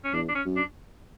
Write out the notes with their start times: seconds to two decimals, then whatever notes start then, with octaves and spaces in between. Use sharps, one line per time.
0.05 C#4
0.13 E2 D4
0.28 D4
0.35 C#4
0.45 F#2
0.56 D4